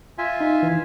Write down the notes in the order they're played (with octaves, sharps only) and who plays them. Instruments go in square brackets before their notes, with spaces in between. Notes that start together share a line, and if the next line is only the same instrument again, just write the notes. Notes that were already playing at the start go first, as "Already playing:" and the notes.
[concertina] F4 E5 G#5
[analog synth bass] D#4
E3